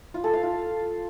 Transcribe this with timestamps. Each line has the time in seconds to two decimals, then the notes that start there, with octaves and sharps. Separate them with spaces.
0.14 F4
0.24 A4
0.33 F5
0.43 F4